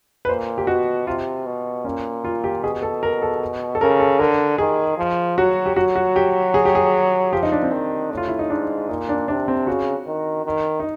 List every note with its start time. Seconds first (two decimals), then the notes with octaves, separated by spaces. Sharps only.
0.25 B4
0.29 A#2 C5
0.58 G4
0.67 B2 F#4
1.07 C3 F4
1.46 B2
1.85 A#2 C#4
2.24 F4
2.44 G4
2.63 B2 G#4
2.83 A4
3.03 A#4
3.22 A4
3.75 A4
3.81 C#3 A#4
4.00 A4
4.19 D3 A#4
4.58 D#3 G#4
4.98 F3
5.37 F#3 F#4
5.66 G4
5.76 F#3 F#4
5.96 F#4
6.16 G4
6.54 G#4
6.65 G4
6.75 G#4
7.33 F3 G4
7.43 D#4
7.52 D4
7.63 C4
7.72 D#3
8.11 A2
8.17 F4
8.28 E4
8.39 D#4
8.50 G#2 D4
8.89 A#2 D#4
9.09 D4
9.28 C3 D4
9.48 C4
9.67 C#3 F#4
10.07 D#3
10.45 D#3
10.80 D#4